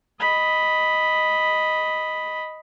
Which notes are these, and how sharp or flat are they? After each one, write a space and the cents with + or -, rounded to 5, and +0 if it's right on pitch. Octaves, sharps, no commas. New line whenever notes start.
D#5 +5 B5 +0